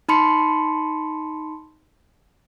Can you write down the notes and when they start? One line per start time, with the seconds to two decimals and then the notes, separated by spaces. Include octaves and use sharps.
0.09 D#4 A5 B5 C6 C#7